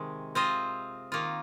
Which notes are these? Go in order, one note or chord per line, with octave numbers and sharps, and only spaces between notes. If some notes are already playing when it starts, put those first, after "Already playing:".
Already playing: C3 D#3 G#3
C4 F4 C5 D#5
D#3 A#3 F4